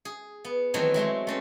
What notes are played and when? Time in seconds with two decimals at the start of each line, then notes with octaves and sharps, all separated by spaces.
0.05 G#4
0.45 B3
0.74 D#3 E3 F#3 A3 C4
0.94 F#3 G#3 A3 C6
1.27 A3 C4 C#4